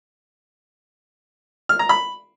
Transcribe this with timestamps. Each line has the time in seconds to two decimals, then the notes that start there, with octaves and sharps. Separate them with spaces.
1.69 F6
1.79 A#5
1.89 B5